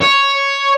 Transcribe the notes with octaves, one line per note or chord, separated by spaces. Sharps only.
C#5